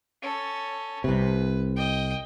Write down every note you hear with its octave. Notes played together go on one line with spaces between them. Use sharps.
C#4 A4
C2 C3 B4
D#5 G5